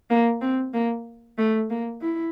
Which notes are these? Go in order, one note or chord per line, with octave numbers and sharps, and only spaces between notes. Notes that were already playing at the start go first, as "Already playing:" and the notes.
A#3
C4
A#3
A3
A#3
E4